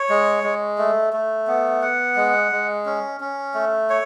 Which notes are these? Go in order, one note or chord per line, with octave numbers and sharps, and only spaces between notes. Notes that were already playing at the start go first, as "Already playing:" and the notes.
Already playing: C#5
G#3
G#3
A3
A3
B3
F#5
G#3
G#3
C#4
C#4
A3
C#5